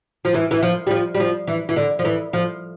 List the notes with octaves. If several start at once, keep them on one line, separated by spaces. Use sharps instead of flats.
F3
E3
E3
F3
G3
F3
G3
F3
E3
E3
D3
F3
E3
F3